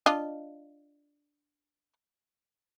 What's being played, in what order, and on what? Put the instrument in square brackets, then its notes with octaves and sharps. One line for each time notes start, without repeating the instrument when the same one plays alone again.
[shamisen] D4 F4 D#5